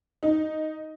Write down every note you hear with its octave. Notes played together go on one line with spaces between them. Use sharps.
D#4